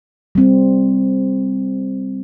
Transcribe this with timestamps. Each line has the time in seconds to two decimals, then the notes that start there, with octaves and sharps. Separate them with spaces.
0.35 G3 C4